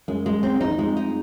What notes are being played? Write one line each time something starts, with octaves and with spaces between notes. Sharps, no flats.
F#2 G#3
G#3
C4
F2 D#4
E2
F2 G#3
D#4